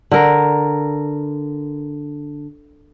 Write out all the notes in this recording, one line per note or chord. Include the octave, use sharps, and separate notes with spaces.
D3 A#4